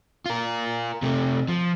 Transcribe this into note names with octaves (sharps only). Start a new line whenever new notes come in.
F4 A#4
C3 A3
F3